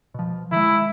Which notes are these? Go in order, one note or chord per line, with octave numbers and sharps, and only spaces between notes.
B2 F3
D#3 G#3 E4